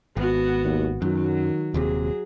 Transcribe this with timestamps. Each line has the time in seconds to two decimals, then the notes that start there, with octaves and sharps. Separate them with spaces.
0.17 G#1 B3 F#4
0.65 D#2
1.02 F#2 D#3 F#3
1.74 D#1 D#2 C3 F#3 G#4